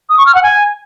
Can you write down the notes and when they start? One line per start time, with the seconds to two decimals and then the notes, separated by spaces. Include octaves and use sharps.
0.09 D#6
0.18 C#6
0.26 F6
0.35 F#5
0.43 G#5